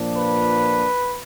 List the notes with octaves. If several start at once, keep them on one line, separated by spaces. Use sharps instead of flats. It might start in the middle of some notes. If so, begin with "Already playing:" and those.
Already playing: A#2 F3 A#3 D4
B4